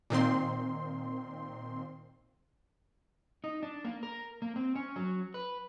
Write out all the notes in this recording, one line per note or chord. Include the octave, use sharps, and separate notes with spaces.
A#2 D#3 C4 C6
D#4
D4
A#3
A#4
A#3
C4
C#4
F#3
B4